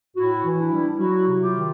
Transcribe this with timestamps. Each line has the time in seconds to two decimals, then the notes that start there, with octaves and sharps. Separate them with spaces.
0.16 A2 E4 F#4
0.45 E3
0.58 D4 E4
0.72 G3
0.99 F#3 E4 F#4
1.27 C3
1.41 F4 G4
1.56 D#3